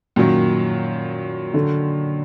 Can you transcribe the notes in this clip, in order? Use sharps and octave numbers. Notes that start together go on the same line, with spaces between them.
F#2 A#2 D#3 F#3
D3